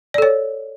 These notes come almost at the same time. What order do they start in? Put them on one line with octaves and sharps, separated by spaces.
D5 A4 C#5